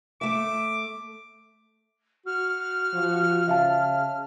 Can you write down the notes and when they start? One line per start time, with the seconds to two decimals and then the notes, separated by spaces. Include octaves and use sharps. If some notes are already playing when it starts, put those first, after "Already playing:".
0.21 A3 E5 D6
2.26 F#4 F6
2.93 F3
3.48 C#3 E5 F5 A5